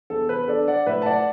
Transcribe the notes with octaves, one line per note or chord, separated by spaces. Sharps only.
E2 A4
B4
D4 A4 D5
D5 F#5
A2 B4 E5
A5
D5 F#5